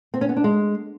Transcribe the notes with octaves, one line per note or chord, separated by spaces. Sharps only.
C4
C#4
B3
D4
G#3